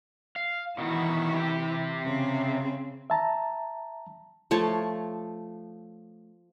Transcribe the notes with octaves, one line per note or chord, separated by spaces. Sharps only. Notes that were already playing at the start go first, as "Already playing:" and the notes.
F5
B2 D#3 E3 E4 F#4
C3 G4
C#3 C4
E5 A5 A#5
F3 A3 C#5 A5